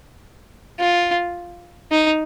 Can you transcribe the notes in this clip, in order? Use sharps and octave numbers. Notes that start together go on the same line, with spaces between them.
F4
D#4